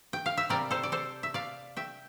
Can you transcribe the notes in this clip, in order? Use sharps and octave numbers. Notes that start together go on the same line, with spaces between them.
G5
F5
E5
C3 G3 C4 A#4 D5
A4 C5
D5
A4 C5
E5
D5 F5
E5 G5